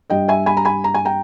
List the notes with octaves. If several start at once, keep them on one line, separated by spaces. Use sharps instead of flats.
G2 G3 D#5 G5
E5 G#5
G#5 B5
A#5
G#5 B5
A#5
G#5
G5 A#5